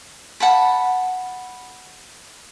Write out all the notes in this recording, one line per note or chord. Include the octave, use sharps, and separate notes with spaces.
F#5 A5 B5